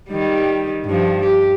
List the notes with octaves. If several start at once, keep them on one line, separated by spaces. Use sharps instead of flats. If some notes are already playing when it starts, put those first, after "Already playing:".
D#3 G3
G2 F3
G4